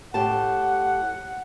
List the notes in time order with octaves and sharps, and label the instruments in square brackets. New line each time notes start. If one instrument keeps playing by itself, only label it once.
[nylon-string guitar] A2 G4 A5 [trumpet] F#5